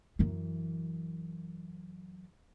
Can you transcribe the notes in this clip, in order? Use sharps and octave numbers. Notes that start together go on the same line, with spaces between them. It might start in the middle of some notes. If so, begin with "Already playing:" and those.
F#2 E3